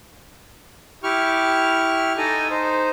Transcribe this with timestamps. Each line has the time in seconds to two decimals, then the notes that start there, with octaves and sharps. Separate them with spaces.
1.03 E4 G4 C#6 F6
2.18 D#4 A4 D#5 G#5
2.51 D#4 C5